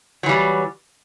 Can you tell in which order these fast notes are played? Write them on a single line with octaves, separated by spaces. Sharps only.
F#3 E3 G3